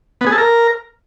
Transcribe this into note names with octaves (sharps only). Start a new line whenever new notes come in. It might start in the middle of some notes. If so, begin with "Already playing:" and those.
B3
G#4
A4
A#4